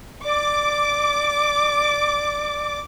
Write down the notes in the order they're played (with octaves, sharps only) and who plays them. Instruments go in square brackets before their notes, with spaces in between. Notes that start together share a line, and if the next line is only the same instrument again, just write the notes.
[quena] D5 [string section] D6